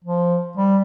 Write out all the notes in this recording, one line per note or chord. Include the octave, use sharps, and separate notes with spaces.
F3
G3